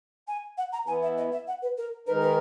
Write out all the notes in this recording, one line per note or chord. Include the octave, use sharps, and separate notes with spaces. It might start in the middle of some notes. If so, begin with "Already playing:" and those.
G#5
F#5
A#5
E3 B3 E4 G#5
E5
D#5
E5
F#5
B4
A#4
D#3 G#3 D#4 A#4 B4
B4